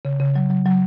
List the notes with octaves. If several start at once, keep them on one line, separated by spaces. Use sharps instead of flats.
C#3
C#3
F#3
F#3
F#3